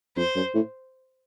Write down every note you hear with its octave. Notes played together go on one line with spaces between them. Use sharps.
F2 C5
F#2
A2